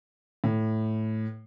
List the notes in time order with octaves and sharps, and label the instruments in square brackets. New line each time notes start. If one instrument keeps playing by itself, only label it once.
[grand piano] A2